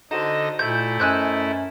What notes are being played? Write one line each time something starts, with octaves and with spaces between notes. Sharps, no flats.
D3 D#4 F#4 A4 C5 D#5 A#6
A#2 A3 E4 G6
F#2 C5 D#5 G#5 E6 F#6 G6